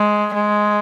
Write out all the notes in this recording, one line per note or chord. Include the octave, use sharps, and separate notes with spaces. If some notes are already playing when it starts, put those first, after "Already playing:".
Already playing: G#3
G#3